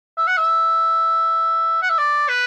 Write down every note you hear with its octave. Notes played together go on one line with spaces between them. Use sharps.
E5
F#5
E5
F#5
E5
D5
B4